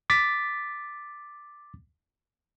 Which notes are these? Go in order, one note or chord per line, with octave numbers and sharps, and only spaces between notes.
D6 A6 B6